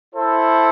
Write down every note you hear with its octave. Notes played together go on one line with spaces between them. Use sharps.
E4 A4 C5